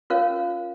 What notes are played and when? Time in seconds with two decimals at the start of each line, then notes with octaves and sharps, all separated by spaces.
0.10 C#4 F4 A#4 C#5 F5